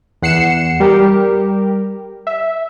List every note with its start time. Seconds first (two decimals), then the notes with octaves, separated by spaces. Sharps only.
0.22 E2 F#5 C7 C#7 E7
0.80 G3 G4 A#4
2.27 E5